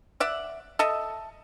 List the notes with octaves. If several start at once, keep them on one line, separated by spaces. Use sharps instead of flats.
D5 E5 F#5
A4 D#5 E5